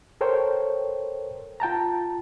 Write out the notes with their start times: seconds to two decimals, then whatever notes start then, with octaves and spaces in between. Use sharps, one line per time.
0.21 A4 A#4 C5 C#5 G5
1.60 F4 G5 A5 A#5